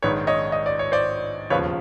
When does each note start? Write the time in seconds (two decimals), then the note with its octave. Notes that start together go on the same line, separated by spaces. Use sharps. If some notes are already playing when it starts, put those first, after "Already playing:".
0.02 A#1 G#2 D#3 B4 C#5
0.27 C#5 D#5
0.52 D#5
0.66 D5
0.79 C#5
0.92 C5 D5
1.50 E1 D#2 C#3 F3 B4 C#5